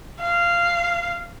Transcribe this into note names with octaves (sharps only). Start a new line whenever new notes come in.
F5